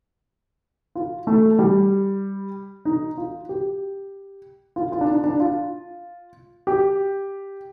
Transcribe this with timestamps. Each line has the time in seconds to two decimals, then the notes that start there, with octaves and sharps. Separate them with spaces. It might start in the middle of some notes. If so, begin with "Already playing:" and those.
0.95 F4
1.27 A3
1.59 G3
2.85 D#4
3.17 F4
3.49 G4
4.76 F4
4.92 F4
5.01 D4
5.08 D#4
5.24 D4
5.40 F4
6.67 G4